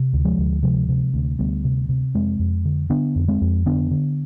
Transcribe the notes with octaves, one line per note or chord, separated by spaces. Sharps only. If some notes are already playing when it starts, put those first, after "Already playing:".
Already playing: C3
D2
F3 G#3
D2
C3 F3 G#3
C3
D2
D2 G3 B3
C3
C3
F2 G#3 C4
F2
D3
D3 B3 D4
F2
G#3 C4
F2
D3 B3 D4
D3